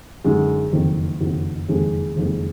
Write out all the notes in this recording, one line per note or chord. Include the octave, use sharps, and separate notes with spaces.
F#2 D3 G#3 D#4 F#4
F#1 F2 D#3 F#3
F#1 F2 D#3 F#3
F#1 F2 D#3 G#3
F#1 F2 D#3 G#3